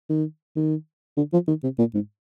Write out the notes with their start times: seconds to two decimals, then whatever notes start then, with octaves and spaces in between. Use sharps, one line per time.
0.10 D#3
0.56 D#3
1.17 D3
1.33 F3
1.48 D#3
1.63 C3
1.79 A#2
1.94 G#2